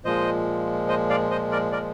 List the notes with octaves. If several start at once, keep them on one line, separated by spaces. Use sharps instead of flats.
A#2 F3 G#3 C5 D#5
C5 D#5
D5 F5
C5 D#5
A#4 D5
A#4 D5